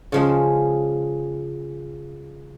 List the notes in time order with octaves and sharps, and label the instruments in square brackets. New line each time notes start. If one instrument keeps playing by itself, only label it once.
[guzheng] C#3 F3 G#3